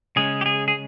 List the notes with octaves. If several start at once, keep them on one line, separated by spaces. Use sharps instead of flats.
C#3 G#3 C#4 G#4
G4
G#4
G#4